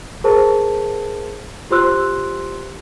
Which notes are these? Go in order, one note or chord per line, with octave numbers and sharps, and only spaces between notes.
G#4 A#4 C5 A5
F4 G4 C5 C6 E6 F#6